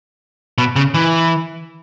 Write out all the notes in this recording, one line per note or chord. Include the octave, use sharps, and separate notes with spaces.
B2
C#3
E3